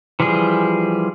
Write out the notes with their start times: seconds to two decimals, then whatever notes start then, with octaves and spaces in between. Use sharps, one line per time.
0.20 E3 F3 G3 G#4